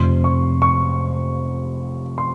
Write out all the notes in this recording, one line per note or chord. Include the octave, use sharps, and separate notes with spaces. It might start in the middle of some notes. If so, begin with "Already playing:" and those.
Already playing: F1 F2 C3 C6
C#6
C#6
C6